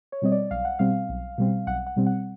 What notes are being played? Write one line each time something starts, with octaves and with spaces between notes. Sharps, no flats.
C#5
B2 G3 C4 D#5
D5
B1 F5
F#5
B2 G3 C4 F5
B1
B2 G3 C4
B1 F#5
F#5
B2 G3 C4
F#5